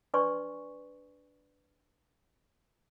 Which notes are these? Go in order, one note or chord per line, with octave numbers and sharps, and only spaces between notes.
D4 B4 D5 G#5 C6 C#6